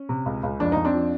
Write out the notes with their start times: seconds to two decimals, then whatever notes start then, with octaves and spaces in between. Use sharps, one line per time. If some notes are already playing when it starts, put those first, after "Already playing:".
Already playing: C#4
0.09 C3
0.26 C#2
0.43 C#2
0.60 F2 D4
0.72 F2 D#4
0.85 C4 D4
0.94 F3